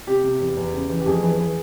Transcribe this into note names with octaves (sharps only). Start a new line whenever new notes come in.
C3 G4
C3
E2
E2
C#3
E3
G4
F2 G#4
E3
E3